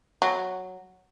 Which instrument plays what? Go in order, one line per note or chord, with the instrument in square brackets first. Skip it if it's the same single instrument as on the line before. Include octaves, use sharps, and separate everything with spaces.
[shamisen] F#3